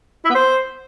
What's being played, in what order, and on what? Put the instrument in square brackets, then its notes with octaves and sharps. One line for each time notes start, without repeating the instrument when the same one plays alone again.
[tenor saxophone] E4
B3
C5